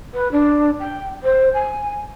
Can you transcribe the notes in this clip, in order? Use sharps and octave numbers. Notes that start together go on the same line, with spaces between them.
B4
D4
G5
C5
G#5